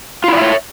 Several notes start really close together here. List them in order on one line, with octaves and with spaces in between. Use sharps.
F4 E4 D5 E5 C#5